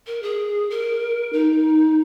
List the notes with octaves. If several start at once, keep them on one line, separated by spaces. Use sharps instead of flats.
A#4
G#4
A#4
D#4